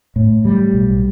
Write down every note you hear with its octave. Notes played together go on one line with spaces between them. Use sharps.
A2
G3
B1